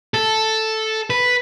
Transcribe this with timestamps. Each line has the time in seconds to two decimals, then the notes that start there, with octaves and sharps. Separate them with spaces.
0.14 A4
1.10 B4